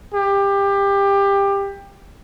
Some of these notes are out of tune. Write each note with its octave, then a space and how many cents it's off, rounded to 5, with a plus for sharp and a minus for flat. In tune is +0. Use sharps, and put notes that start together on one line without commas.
G4 +20